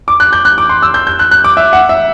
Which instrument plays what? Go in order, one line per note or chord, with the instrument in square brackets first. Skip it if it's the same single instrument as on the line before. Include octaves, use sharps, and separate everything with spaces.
[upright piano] D6
F#6
G6
F#6
D6
C6
E6
G6
G6
F#6
F#6
D6
E5
F#5
E5